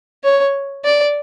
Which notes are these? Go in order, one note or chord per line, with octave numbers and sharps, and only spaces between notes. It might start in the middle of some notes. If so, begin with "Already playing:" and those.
C#5
D5